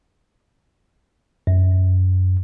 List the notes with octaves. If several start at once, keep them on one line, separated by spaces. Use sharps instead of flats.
F#2